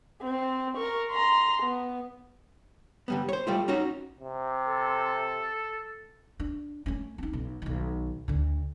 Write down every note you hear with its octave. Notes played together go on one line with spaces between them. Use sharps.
C4
A#4 C#6
A#5 C6
B3
D3 G3 B3
C5 C#5
G3 A3 F4
C#4 D#4 F#4
C3
A4
D4
A3 C#4
C4 D#4
B1
B1 D#3
D2 D3